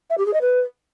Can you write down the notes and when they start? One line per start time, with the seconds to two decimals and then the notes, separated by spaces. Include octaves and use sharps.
0.10 E5
0.18 G4
0.25 G#4
0.33 D#5
0.41 B4